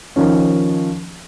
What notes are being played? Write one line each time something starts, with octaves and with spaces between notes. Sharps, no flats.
D#3 F3 C#4